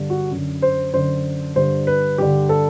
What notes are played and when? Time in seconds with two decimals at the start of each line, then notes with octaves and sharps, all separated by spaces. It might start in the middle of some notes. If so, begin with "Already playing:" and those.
Already playing: G2 D3
0.10 F#4
0.31 F#2 D3
0.62 C5
0.93 F#2 D3 C5
1.56 G2 D3 C5
1.87 B4
2.18 G2 D3 G4
2.49 A4